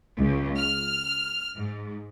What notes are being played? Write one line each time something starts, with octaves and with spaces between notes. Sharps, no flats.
C#2
F6
G#2